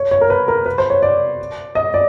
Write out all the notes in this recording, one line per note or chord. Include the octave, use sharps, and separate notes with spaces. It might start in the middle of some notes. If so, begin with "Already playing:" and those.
Already playing: C#5
C#5
A#4
B4
A#4
B4
C5
C#5
D5
D#5
D5